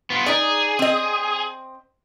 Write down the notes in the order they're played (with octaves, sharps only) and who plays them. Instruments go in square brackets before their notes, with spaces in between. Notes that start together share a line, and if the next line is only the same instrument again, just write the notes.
[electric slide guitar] B3 F4
[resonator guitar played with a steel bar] D#4 D5 [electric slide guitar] G#4
[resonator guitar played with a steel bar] C4 D#5